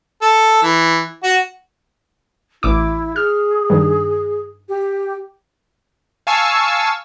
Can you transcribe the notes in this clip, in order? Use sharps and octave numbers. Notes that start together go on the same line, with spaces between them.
A4
E3
F#4
A1 E4 D6
G#4 F6
G2 D#3
G4
F5 G#5 A5 C#6 E6